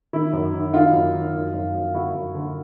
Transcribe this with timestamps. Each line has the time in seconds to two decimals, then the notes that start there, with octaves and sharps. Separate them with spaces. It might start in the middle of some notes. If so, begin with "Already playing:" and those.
0.13 D#3 E4
0.33 F#2
0.53 D#3
0.73 D#3 D#4 F4
0.93 F#2
1.14 D#3
1.34 F#2
1.54 F#2
1.75 F#2
1.94 D3 E4 F#4
2.15 F#2
2.35 D3